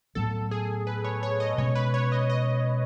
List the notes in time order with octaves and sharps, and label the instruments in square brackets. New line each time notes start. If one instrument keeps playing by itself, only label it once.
[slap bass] A2 F#3 B3 [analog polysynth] A4
[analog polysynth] G#4
B4
C#5
C#5
D#5
[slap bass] B2 G#3 C#4 [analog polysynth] C#5
[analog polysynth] B4
C#5
D#5
D#5